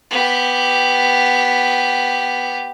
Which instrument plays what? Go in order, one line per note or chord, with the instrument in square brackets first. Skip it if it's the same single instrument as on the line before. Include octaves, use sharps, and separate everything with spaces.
[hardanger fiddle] B3 G4